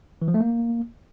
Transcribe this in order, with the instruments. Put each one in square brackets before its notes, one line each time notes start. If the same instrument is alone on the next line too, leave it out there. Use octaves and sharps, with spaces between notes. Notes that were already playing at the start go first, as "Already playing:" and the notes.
[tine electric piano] E3
F3
A3
A#3